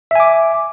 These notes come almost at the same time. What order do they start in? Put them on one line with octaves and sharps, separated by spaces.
E5 G#5 D6